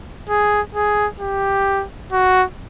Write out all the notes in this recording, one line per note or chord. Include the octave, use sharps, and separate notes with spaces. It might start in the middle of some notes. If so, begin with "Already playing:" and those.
G#4
G#4
G4
F#4